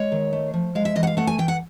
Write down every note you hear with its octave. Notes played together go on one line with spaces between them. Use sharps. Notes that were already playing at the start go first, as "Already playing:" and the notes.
Already playing: G#3 C#5
D#3
A3
F3
G#3 F5
E5
E3 D#5
F#5
F5
A3 F#5
G#5
E3 G5
F#5